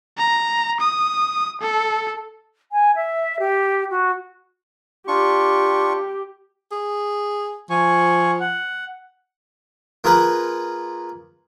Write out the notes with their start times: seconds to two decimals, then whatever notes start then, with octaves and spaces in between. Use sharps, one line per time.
0.17 A#5
0.80 D#6
1.61 A4
2.72 G#5
2.95 E5
3.39 G4
3.90 F#4
5.08 D4 F4 G4 C#6
6.72 G#4
7.70 F3 G#5 C#6
8.40 F#5
10.04 A#3 F4 G#4 A#4 B4